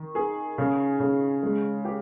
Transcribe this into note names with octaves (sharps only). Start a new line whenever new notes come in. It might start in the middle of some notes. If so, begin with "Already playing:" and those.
Already playing: D#3
G#4
C#3
C#3
G#3
G4